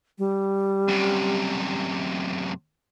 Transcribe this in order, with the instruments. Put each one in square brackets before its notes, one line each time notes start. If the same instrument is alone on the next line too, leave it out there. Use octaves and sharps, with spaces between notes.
[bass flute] G3
[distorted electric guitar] F#2 C3